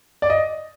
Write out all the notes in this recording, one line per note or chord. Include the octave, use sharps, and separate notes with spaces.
D5
D#5